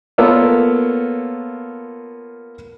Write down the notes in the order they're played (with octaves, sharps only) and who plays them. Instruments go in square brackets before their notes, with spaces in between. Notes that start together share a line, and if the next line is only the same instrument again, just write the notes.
[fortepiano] A#3 B3 F4 A4 A#4 C#5